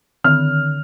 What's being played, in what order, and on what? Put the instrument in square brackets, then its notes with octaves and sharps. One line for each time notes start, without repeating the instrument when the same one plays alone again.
[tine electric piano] D3 [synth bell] D#3 [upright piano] F6